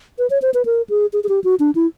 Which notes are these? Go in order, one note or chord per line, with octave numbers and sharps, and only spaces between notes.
B4
C#5
C5
B4
A#4
G#4
G#4
G#4
G4
F#4
D4
E4